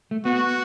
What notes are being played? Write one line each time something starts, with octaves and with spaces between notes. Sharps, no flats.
A3
B3 F#4